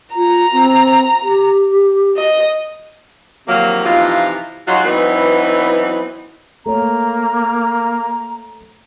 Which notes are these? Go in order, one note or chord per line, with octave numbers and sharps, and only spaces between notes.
F4 A#5
C4
G4
D#5
C3 D#3 F3 F#3 A#3
C3 E3 F3 D#4 F4
F#3 G#3 D#4 F4 F#4
E3 F#3 B3 C4 D#4 B4
A3 A#3 C#5 A#5